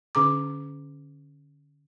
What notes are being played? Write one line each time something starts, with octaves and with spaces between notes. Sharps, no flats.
D3 C#4 G#4 A#5 D6